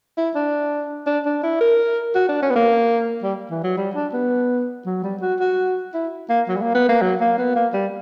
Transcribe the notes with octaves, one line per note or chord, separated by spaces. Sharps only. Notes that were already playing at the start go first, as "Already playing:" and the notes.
E4
D4
D4
D4
E4
A#4
F#4
D4
C#4
B3
A#3
G3
E3
F#3
G3
D4
B3
F#3
G3
F#4
F#4
E4
A#3
F#3
G3
A#3
B3
A#3
F#3
A#3
B3
A#3
G3